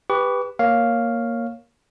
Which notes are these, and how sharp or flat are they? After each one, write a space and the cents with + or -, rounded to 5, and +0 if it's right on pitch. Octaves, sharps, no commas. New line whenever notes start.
G4 +20 B4 +0 C#6 +40
A#3 +0 C#5 +0 F5 +0